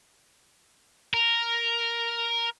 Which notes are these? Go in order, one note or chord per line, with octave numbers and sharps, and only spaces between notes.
A#4